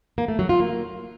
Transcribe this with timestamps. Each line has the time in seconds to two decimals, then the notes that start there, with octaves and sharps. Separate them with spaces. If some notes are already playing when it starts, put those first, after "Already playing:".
0.18 A#3
0.28 A3
0.39 F#3
0.49 F4
0.60 A#3